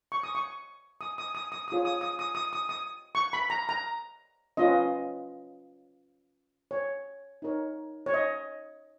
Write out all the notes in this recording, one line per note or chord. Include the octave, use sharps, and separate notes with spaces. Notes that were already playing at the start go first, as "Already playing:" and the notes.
C#6
D#6
C#6
D#6
D#6
D#6
D#6
D#6
F4 G#4 C#5
D#6
D#6
D#6
D#6
D#6
D#6
C#6
B5
A#5
A#5
C#4 F4 B4 D#5
C#5
D#4 A#4 C#5
C#5
D#5